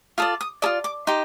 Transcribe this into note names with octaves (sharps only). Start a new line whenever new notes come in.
F4 A4 D5 D#6
D#6
F4 A4 D5 D#6
D6
D#4 G4 C6